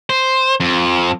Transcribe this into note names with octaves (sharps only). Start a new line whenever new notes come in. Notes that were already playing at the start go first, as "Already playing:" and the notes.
C5
F2